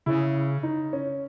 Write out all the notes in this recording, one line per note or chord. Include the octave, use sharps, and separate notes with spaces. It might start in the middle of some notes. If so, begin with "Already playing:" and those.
C#3 E4
D#4
C#4